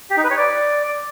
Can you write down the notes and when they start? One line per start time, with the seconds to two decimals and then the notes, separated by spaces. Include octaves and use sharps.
0.10 G4
0.17 D#4
0.24 B4
0.31 C#5
0.37 D5